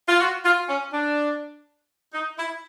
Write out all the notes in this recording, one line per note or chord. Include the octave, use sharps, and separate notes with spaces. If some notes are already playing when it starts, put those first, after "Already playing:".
F4
F#4
F4
C#4
D4
D#4
E4